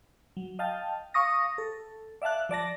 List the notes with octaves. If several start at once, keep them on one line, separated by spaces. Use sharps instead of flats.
F#3
D#5 F5 G5 A5
F5 C#6 D#6 A#6
A4
D5 E5 F5 A5 F#6
F3 D5 A5 A#6